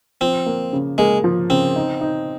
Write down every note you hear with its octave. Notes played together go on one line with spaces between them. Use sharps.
F3 C4
A#3
C#3
G#3 A#3
F3
C#3 C4
D#4
D#4